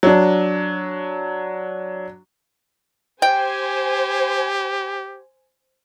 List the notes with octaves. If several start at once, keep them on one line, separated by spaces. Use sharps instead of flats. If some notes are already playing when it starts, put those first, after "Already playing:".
F#3 D4
G4 C5 G5 G#5